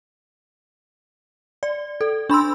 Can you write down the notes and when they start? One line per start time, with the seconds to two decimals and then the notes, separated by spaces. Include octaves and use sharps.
1.63 D5
2.01 A4
2.29 D4 B5 C6 E6